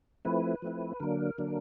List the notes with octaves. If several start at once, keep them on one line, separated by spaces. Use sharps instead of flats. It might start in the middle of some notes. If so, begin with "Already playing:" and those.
F3 A3 C4 E4 B4
F3 A3 C4 E4
D3 F#3 A#3 D4 A#4
D3 F#3 A#3 D4